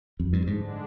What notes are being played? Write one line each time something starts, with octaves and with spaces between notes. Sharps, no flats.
F2
G2
G#2 D3 G#3 D4